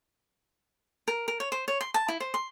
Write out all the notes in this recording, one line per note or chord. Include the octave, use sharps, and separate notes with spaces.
A#4
A#4
C#5
C5
C#5
C6
A5
E4
C5
C6